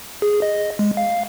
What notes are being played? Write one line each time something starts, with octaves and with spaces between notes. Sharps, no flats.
G#4
D#5
G#3
F5